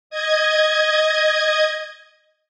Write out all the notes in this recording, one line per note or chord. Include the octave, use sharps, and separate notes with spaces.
D#5 G#6